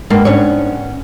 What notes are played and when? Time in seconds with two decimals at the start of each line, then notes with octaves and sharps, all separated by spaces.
0.10 G2 G#3 A#3 F#5
0.25 G#2 B3 C#4 C#5